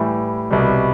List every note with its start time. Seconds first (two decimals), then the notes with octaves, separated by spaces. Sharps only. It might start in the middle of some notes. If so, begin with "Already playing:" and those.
Already playing: A2 E3 G3
0.51 C2 B2 G3